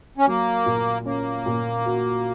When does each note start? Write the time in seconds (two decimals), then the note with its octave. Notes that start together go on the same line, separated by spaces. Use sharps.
0.18 C#4
0.26 F#3 A#3
0.66 A#2
1.06 A#3 C#4
1.46 A#2
1.86 F#4